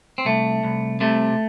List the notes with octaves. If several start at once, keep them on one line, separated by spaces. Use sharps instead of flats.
C4
C2 A3
C2
C3 A3